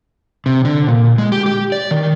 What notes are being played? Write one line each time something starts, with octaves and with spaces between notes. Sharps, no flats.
C3
D3
A#2
G#3
G4
G4
D5
D#3